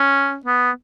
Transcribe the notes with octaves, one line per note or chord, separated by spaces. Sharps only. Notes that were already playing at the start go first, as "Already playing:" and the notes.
Already playing: C#4
B3